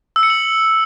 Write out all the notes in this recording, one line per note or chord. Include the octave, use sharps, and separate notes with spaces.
E6
C#7
F#7